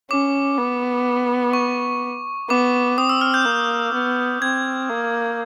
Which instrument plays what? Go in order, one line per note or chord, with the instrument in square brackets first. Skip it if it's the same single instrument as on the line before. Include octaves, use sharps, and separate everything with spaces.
[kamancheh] C#4 [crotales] D6
[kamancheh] B3
[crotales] C#6
[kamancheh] B3 [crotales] D6
[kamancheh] C4 [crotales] D#6
[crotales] E6
F6
G6
[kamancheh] A#3
B3
[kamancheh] C4 [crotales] G#6
[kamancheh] A#3